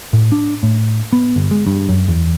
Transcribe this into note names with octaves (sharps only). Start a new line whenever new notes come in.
A2
D4
A2
B3
G1
G#3
G2
F#2
E2